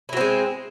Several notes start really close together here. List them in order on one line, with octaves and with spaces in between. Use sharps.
E4 F#3 C4 G#3